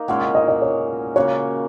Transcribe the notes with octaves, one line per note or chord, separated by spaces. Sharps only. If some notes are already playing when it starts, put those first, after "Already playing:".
Already playing: A#3 D#4
A#2 G#3 C#4 F#5
F#5
D#5
D#5
C#5
C#3 A#3 C#4 F#4 C#5